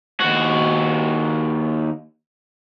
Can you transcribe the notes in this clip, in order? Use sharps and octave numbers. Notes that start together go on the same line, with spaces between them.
D#2 F#4